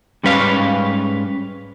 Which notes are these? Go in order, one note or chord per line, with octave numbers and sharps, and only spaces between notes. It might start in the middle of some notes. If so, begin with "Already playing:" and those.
G#2 G3 C#4 B4 F5